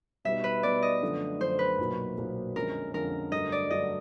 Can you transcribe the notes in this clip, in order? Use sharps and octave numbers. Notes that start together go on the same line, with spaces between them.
B2 G3 B3 D#4 E5
B4
B2 G3 B3 D#4 D5
D#5
F#2 D3 F3 A3
F#2 D3 F3 A3 C5
B4
B1 A#2 F#3 A#3
B1 A#2 F#3 A#3
F2 D3 F3 G#3 C#4 A#4
F2 D3 F3 G#3 C#4 A#4
G2 D3 F#3 A3 D#5
D5
G2 D3 F#3 A3 D#5